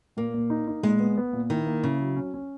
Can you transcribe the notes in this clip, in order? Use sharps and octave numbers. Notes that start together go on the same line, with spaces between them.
A#2 A#3
A#2
D#4
D#4
A#2 G#3
B3
B3
A#2
D#3 E4
A#3
C#3 E4
F#3
C#4
C#4